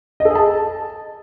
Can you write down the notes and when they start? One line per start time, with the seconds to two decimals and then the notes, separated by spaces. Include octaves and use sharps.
0.20 D#5
0.25 A4
0.30 G#4
0.35 A5